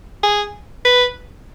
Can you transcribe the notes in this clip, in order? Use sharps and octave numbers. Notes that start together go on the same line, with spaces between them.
G#4
B4